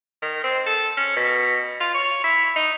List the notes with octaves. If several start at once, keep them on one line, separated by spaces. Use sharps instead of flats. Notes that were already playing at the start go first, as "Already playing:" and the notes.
D#3
C4
A4
C#4
B2
F4
C#5
E4
D#4